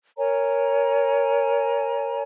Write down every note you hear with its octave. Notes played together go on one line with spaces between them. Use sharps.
A#4 C#5 G#5 A#5